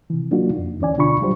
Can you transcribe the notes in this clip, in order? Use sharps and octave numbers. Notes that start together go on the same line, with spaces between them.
C3 E3
F#3 A#3 D4 D#4 F4 F#4
F2
D2 E3 C#4 D5 G#5
B2 D3 D4 F4 B5 C#6
F#3 G3 F4 G4 C5